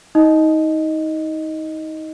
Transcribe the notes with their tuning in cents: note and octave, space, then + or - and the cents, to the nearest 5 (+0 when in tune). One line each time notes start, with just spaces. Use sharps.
D#4 +25 D#5 +0